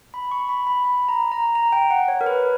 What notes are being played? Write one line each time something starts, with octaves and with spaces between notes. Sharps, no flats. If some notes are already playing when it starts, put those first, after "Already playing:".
B5
C#6
B5
B5
B5
A#5
A#5
A#5
G5
F#5
C#5
A#4
B4